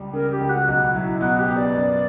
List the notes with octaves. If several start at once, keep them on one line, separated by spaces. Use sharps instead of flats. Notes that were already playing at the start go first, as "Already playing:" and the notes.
Already playing: C#2 G3
C#3 A#4
G4
C#2
F#4
B1 F#4
F#3 E4
B2 F#4
G4
B3
D5
F#2